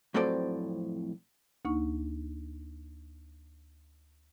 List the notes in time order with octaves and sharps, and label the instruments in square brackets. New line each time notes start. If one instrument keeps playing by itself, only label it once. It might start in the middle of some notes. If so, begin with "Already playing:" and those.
[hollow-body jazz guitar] F2 A2 F#3 C4 A4 D5
[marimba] D2 A#3 D#4 C#6